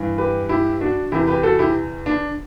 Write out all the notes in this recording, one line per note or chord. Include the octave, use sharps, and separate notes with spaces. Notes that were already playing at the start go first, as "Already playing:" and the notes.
Already playing: G2 E3
G4 B4
E4 G4
D4 F#4
E2 C3 E3 E4 G4
G4 B4
F#4 A4
E4 G4
D4